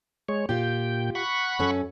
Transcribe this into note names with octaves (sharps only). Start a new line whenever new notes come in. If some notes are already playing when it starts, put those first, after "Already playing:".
G#3 C#5
A#2 F4 G4 G5
F#5 B5 C#6
F#2 C#4 A4